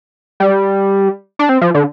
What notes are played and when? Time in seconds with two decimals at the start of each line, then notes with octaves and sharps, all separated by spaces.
0.40 G3
1.39 D4
1.49 C4
1.61 F3
1.74 D3